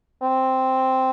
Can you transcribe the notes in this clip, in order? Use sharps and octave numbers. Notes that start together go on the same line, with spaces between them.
C4